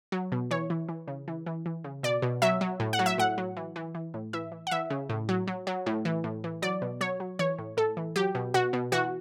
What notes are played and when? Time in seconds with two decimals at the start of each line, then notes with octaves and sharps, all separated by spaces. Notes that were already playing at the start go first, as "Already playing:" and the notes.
0.12 F#3
0.32 B2
0.51 E3 C#5
0.70 E3
0.89 E3
1.08 C#3
1.28 E3
1.46 E3
1.66 E3
1.84 C#3
2.03 B2 D5
2.22 B2
2.42 F#3 E5
2.61 F#3
2.80 A2
2.93 F#5
2.99 F#3
3.06 E5
3.18 A2 F#5
3.38 F#3
3.57 E3
3.76 E3
3.95 E3
4.14 A2
4.33 E3 E5
4.52 E3
4.67 F#5
4.71 E3 E5
4.90 C#3
5.09 A2
5.29 F#3
5.47 F#3
5.67 F#3
5.86 A2
6.05 E3
6.24 A2
6.44 E3
6.62 F#3 D5
6.82 B2
7.01 F#3 C#5
7.20 F#3
7.39 E3 C#5
7.59 A2
7.77 A2 A4
7.97 E3
8.16 F#3 G4
8.35 B2
8.54 B2 F#4
8.73 B2
8.92 E3 F#4